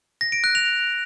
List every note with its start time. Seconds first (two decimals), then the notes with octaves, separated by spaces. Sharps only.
0.21 A#6
0.32 D7
0.44 F#6
0.55 F7